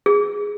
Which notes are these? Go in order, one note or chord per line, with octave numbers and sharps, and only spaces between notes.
G#4